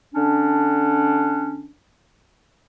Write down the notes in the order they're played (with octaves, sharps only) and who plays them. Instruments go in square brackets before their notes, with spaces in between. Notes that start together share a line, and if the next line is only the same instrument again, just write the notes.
[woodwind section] D3 C#4 D4